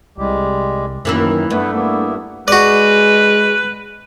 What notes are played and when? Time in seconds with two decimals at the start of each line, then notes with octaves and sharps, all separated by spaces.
0.18 C2 G3 G#3 G4
1.05 F#2 D#3 E3 A#3 E4
1.50 G2 A3 B3 E4 B4
1.73 A#3 B3 E4
2.48 G#3 F#4 B4 D5